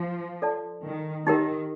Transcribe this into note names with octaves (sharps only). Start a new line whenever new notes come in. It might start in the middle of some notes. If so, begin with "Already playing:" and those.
Already playing: F3
A4 D5 A5
D#3
D#3 D#4 G4 A#4